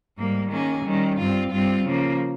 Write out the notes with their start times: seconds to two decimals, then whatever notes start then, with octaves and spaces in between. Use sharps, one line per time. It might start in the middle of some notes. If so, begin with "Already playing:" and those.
0.17 G#2 G3 A#3
0.49 D#3 A#3 C#4 G#4
0.84 D#3 G3 C#4
1.17 G2 G3 C4 F4
1.51 G2 G3 C4 F4
1.85 C#3 F3 A#3